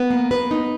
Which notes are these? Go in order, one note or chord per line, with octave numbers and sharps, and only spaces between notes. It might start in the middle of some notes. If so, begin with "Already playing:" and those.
Already playing: B3
A#3
B4
D#4